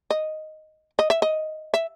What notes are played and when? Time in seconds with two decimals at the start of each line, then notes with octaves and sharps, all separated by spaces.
0.10 D#5
0.99 D#5
1.10 E5
1.22 D#5
1.74 E5